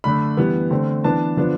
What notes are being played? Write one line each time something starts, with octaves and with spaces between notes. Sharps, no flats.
D3 A3 D4 B5
E3 G3 B3
D3 A3 C4
E3 B3 D4 A5
D3 F3 B3 D4